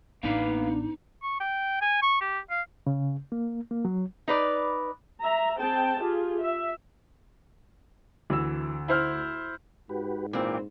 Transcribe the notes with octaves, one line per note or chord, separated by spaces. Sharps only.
A1 A#3 B3 D4 D#4 B4 F5
C#6
G5
G#5
C#6
G4
F5
C#3
A#3
A#3
F#3
D#4 B4 D5
E5 A#5
C4 G#4 G5 A5
F4 G4 G#4
E5
D2 E3 E6
E4 C5 F6
G#2 F#4 G4 B4
A#2 E3 C4 F5 G5 D6